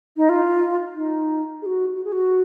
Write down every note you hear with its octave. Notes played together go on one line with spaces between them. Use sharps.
D#4
F4
D#4
G#4
F#4
F#4
G#4
F#4